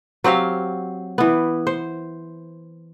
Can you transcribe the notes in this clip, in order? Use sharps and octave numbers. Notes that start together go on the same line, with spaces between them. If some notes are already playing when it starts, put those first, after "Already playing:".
F#3 C4 G4 F5
E3 B3
C5